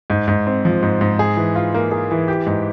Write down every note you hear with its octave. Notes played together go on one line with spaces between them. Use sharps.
G#2
G#2
C4
F3
G#2
G#2
G#4
E3
F4
A#3
G#4
E3
G4
G#2